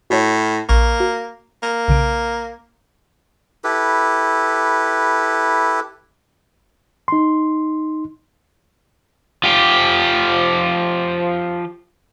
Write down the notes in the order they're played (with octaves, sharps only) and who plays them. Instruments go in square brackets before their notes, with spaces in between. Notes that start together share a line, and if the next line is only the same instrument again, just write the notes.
[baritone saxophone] A2 [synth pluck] F#4 C#5
[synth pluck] A#1 C#6 [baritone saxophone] A#3
[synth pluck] F#4
[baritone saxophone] A#3
[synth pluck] B1 C#3 D7
[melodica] E4 G4 A4 B4
[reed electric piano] D#4 C6
[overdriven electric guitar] F3 G4